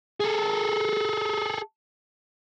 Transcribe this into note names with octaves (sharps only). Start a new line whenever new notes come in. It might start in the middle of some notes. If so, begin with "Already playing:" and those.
G#4 A4